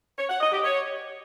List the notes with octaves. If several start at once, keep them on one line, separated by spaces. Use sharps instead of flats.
C#5
F#5
D#5
G4
C#5